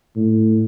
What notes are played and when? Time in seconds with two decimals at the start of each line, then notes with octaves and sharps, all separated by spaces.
0.16 A2